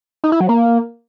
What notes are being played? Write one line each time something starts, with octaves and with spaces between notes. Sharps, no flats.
D#4
E4
F#3
A#3